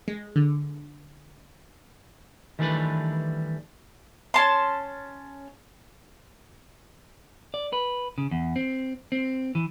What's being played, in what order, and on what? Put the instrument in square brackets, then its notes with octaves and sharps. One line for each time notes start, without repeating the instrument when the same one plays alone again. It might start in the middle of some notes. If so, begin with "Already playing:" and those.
[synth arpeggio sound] G#3
D3
[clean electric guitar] D#3 E3 G3 A3 D4 B4
[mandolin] C#4 A5 C6
[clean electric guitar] D5
B4
C#3
E2
C4
C4
E3